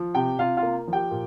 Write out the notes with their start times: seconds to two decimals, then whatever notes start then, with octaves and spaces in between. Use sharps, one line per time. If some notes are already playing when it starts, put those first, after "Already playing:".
Already playing: F3
0.15 C3 G4 G5
0.39 C3 F4 F5
0.57 F4 F5
0.63 A#3
0.88 F3
0.93 G4 G5
1.11 A#2